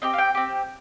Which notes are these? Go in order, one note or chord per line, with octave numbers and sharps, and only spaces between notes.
C4 G4 D#5
F5
G5
C4 G4